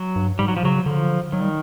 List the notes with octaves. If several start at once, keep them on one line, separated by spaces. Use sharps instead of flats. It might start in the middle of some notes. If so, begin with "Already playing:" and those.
Already playing: F#3
G2
G#2 G3
F#3
F3
C#3 F#3
D3 F3
D#3 F#3
G3